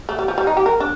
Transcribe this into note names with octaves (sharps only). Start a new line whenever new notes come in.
A3
G3
F3
G3
D#4
G4
A#4
D4